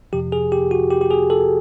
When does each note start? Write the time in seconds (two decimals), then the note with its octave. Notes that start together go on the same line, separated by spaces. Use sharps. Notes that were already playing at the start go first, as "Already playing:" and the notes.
0.13 F2 C3 F3 G4
0.32 G#4
0.52 G4
0.71 F#4
0.90 G4
1.01 G4
1.11 G#4
1.30 A4